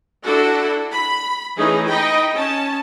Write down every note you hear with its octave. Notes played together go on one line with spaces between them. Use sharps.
D4 E4 F#4 A4 F#5
B5
E3 A3 C#4 D#4 G#4
D#4 D#5 G5 B5
C#4 A5